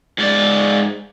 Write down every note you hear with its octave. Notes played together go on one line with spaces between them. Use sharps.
G#2 D5